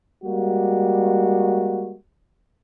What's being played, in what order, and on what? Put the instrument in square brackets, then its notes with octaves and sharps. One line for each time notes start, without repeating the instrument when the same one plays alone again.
[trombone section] G3 G#3 A#3 F#4